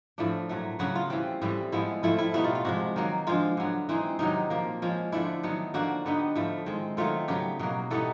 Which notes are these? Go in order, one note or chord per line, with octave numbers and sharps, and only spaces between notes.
A2 F3 A3 D4
A#2 F#3 A3
C#3 F#3 B3 F#4
F4
E3 G3 C4
A2 E3 G3 C4
A2 F3 G#3 B3 E4
A2 F3 A3 C4 E4
E4
B2 G3 B3 D#4 E4
F4
F4
C3 F3 G#3 F#4
D#3 F#3 A#3
D3 F3 G#3 F4
D3 F#3 B3
E3 G#3 C4 D#4
C3 D#3 F#3 D#4
A#2 F3 A#3
F3 G#3 C#4
D3 F3 A3 D4 E4
D#3 F#3 B3
D3 F3 A#3 D4 F#4
D3 G3 B3 D#4
A2 F3 A3
D#3 G#3 C4
D#3 F#3 A3 C4 F4
C#3 F#3 B3 G4
B2 F#3 A#3
E3 G3 B3 D#4 A4